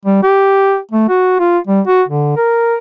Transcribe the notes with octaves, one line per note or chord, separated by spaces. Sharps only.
G3
G4
A3
F#4
F4
G3
F#4
D3
A#4